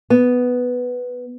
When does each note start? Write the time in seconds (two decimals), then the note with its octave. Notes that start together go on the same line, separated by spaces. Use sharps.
0.10 B3